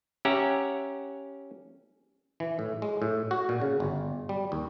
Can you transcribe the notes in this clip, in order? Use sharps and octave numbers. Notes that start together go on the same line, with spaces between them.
C#4 G4 E5 F#5 A#5
E3
A2
G#3
A2
F#4
A#2
C#3
G1
G3
D#2